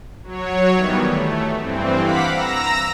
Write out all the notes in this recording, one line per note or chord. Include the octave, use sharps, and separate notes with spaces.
F#3 C#5
D#3 E3 G3 B3
A3
G2 E3 C4
F5 F#5 B5 D6 B6
A#5 E6 A#6